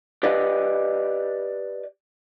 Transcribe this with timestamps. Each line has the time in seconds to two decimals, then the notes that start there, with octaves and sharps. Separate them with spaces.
0.23 G4 B4 D5 D#5